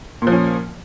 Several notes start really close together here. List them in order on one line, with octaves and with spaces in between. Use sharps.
A#2 F3 C#4